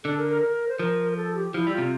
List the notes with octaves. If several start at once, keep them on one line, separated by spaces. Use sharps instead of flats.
D3 A4
A#4
A#4
A#4
C5
F3 A#4
A#4
A4
G4
F3 E4
G3
F4
C3